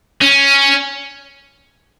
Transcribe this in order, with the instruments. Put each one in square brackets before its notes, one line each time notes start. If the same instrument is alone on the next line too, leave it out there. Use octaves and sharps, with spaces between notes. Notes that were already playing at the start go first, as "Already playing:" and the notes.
[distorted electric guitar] C#4